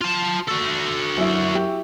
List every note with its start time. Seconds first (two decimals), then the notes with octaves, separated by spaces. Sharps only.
0.01 F4 A5
0.48 F#4 A4
1.17 F#2 E4
1.55 G4